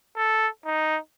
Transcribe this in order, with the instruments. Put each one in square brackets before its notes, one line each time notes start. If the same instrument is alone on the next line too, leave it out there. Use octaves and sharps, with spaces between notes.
[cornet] A4
D#4